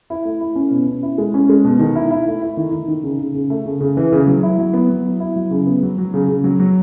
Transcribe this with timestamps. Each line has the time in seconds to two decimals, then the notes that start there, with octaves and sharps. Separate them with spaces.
0.10 E4
0.25 A3
0.41 E4
0.55 C#4
0.71 B2
0.87 C#4
1.03 E4
1.18 G#3
1.34 C#4
1.49 G#3
1.65 B2
1.79 D#3
1.96 E4
2.11 E4
2.27 A3
2.42 E4
2.57 D#3
2.72 D#3
2.88 D#3
3.03 C#3
3.19 C#3
3.34 C#3
3.50 A3
3.65 C#3
3.80 C#3
3.97 E3
4.12 C#3
4.27 F#3
4.43 E4
4.59 F#3
4.74 B3
4.90 F#3
5.05 E4
5.20 E4
5.36 F#3
5.51 C#3
5.67 B3
5.83 F#3
5.98 F#3
6.14 C#3
6.28 C#3
6.44 F#3
6.60 F#3